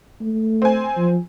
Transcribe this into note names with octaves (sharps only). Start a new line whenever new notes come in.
A3
C4 G#5
F3